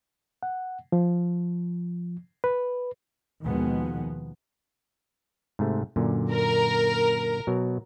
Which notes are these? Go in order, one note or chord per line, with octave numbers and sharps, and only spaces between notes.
F#5
F3
B4
D#2 B2 D#3 F3 G#3 B3
G#2 C3 A3
F#2 A#2 D3
A#4
B2 F#3